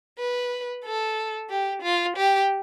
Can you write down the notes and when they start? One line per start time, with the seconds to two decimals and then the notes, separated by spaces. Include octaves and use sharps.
0.19 B4
0.85 A4
1.50 G4
1.83 F4
2.16 G4